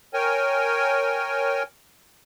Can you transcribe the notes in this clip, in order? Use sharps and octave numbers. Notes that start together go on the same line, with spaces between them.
A#4 C#5 G5 G#5